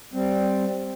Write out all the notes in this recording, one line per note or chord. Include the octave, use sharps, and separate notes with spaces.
G3 C4